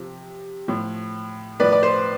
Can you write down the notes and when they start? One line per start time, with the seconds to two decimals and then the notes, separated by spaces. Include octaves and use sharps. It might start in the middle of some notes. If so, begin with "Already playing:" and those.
Already playing: C3 F3
0.68 A2 F3
1.60 A2 F3 B4 D5
1.72 D5
1.83 C5